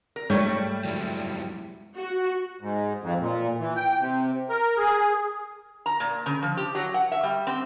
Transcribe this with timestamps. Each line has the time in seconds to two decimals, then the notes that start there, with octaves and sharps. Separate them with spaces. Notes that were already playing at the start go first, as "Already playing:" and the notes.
0.16 A#4
0.30 G#2 G3 A3 C#5
0.85 F#3 G#3 E4
1.97 F#4
2.61 G#2
3.02 F2
3.20 A#2
3.60 E3
3.76 G5
4.00 C3
4.49 A#4
4.77 G#4
5.86 A#5
6.00 A#2
6.26 C#3
6.43 F3
6.57 G4
6.75 F#3
6.94 F#5
7.12 E5
7.23 G3
7.47 C4